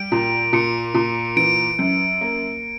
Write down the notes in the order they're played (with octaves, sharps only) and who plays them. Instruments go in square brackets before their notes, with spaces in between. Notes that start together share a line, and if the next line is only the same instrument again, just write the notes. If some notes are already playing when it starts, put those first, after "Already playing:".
Already playing: [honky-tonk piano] G3 [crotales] D7
[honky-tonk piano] A#2
[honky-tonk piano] A#2 [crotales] C#7
[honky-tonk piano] A#2
[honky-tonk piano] E3 [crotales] D7
[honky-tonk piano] F#2
A#3